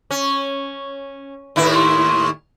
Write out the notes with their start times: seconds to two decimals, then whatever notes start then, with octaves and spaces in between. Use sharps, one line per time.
0.11 C#4
1.56 D#2 A2 E4 B4
1.74 C6